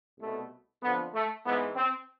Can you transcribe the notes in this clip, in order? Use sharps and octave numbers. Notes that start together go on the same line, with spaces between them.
C2 A3
B2
F2 D3 F3 B3
A3
G#2 E3 B3
C4